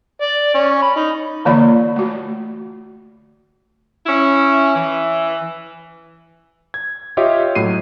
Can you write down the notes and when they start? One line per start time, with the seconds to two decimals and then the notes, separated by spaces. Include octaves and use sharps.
0.21 D5
0.54 C#4
0.82 B5
0.96 D#4
1.45 D3 E3 A#3 F4 D5 B5
1.96 A3 F#4
4.06 C#4 E4
4.75 E3
6.74 G#6
7.17 F4 G4 C#5 D#5 E5
7.55 A2 F#3 C7 D#7